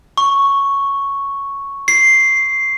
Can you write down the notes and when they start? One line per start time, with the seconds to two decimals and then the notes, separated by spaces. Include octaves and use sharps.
0.17 C#6
1.88 C7